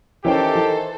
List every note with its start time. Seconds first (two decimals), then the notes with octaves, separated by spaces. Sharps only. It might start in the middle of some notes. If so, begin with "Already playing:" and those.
0.25 D#3 E3 C#4 G4 A4 C5 G5
0.55 E3